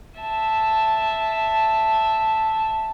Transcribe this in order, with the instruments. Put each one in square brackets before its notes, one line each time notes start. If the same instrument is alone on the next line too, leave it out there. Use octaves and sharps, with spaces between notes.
[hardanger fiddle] E5 A5